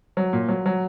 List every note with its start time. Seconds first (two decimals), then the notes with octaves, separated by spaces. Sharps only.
0.17 F#3
0.33 A#2
0.48 F#3
0.66 F#3